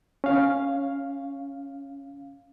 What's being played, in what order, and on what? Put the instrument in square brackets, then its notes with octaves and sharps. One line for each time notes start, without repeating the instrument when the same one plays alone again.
[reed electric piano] C#4 F5